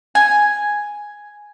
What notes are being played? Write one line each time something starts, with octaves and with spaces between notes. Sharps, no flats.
G#5